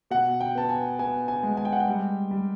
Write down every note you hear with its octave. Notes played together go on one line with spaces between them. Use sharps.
B2 F#5
G5
B3 A5
G#5
B3 G#5
G#5
G#3
G#5
G5
F#5
G5
G3
G3